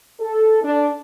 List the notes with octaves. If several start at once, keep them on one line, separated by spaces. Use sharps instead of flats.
A4
D4